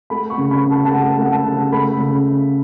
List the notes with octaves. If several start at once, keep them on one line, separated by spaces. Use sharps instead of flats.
A3 B5
C#6
C#3
B5
C#3
A5
A5
A3 F#5
A3 F#5
A5
C#3
A3 B5
C#3